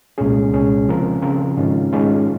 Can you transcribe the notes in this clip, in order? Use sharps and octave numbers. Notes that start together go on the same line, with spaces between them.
C2 A#2 G#3 C#4 G#4
C2 A#2 G#3 C#4 G#4
C#3 F3 C4 F4 A#4
C#3 F3 C4 F4 A#4
G#2 D#3 G#3 C#4 F4
G#2 D#3 G#3 C#4 F4